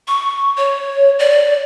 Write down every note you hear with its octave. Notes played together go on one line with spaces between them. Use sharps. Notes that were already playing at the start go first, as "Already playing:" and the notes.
C#6
C#5
D5